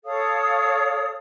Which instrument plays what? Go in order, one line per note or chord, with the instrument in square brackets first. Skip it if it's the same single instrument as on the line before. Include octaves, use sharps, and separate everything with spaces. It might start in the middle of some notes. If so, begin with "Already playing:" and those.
[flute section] A4 C#5 F5 D#6